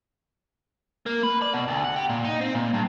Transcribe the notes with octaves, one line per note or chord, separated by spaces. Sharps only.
A#3
B4
D5
B2
D2
F#5
G4
A#2
D#4
C4
A#2
G2